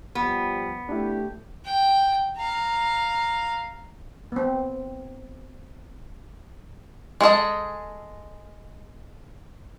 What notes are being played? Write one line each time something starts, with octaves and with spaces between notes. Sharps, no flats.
F3 G3 B3
A3 D4 E4 G4
G5
F5 A#5
B3 C4
G#3 G#4 A4 D#5